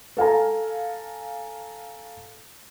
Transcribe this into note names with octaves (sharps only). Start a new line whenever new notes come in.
A4 F5 G#5 A#5